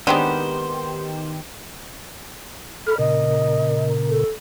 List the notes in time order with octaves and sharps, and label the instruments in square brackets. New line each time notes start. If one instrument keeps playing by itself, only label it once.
[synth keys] D#3 G4 [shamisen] G#3 C4 D4 [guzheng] B3 [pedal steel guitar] C5
[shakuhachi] A4 [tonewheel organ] B5 F6
[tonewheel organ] A#2 C#3 A#4 [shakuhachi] D#5
[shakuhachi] A4